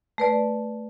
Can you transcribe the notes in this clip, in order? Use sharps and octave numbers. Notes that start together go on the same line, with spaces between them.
A3 B4 D5